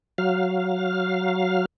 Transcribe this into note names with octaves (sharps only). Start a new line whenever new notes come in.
F#3 F5